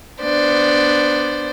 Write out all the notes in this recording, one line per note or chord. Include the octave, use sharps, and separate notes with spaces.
B3 D4 C5 D5